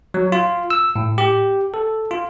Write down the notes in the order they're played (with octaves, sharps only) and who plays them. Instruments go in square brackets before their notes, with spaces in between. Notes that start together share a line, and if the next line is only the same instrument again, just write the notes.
[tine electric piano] F#3
F4
E6
A2
G4
A4
F4